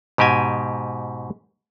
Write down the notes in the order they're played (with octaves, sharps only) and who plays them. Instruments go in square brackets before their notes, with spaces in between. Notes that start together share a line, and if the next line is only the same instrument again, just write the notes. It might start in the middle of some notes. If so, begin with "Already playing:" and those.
[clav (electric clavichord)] G#2 B2 G4 D#5 G#5